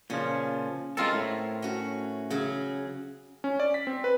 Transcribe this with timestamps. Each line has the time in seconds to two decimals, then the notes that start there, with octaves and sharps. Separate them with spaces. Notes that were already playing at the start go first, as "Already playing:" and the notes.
0.10 A#2 C#3 F3 C#4
0.97 G#3 C4 F4 A4 A#4 A5
1.13 A2
1.62 C#4 F#4
2.30 C#3 F#3 G#4
3.44 C#4
3.60 D5
3.74 B6
3.87 C4
4.04 B4